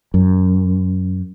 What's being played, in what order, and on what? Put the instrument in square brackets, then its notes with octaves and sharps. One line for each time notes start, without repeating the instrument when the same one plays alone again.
[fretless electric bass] F#2